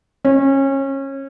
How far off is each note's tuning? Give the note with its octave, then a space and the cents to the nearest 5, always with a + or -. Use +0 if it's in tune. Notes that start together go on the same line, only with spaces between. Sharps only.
C#4 -25